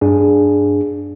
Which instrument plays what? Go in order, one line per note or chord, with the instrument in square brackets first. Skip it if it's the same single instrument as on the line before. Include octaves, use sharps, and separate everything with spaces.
[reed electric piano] G2 D4 G#4